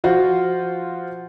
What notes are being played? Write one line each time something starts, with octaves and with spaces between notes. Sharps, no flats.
F3 F4 F#4 C5